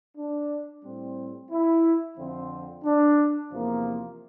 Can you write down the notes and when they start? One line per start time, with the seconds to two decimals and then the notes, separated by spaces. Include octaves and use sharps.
0.17 D4
0.84 A2 G3 C4
1.51 E4
2.18 F2 D3 F3 C4
2.84 D4
3.51 E2 C3 F3 A#3